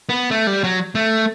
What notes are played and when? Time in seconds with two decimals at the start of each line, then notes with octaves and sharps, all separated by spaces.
0.09 B3
0.31 A3
0.47 G3
0.64 F#3
0.95 A3